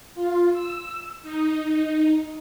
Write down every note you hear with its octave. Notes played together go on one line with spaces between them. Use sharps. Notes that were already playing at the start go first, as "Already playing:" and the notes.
F4
E6
D#4
D#4